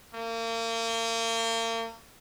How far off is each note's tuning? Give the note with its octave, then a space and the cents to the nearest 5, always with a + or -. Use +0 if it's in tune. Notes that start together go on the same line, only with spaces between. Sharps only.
A#3 -35